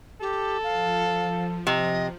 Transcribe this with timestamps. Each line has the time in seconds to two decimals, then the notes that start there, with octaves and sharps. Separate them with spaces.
0.21 G4 A4
0.64 F3 F5
1.67 C3 D#5